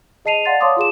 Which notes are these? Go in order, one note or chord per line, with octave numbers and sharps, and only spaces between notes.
G#4 D#5 A5 C7 D#7 F7
D5 F5 F#5 C6 A6
C#5 F5 A5 C6 D6 D#6
F4 G#4 E7